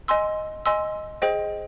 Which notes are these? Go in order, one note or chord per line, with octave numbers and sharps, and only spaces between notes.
D#5 G#5 C6 E6
D#5 G#5 C6 E6
G#4 C5 D#5 G5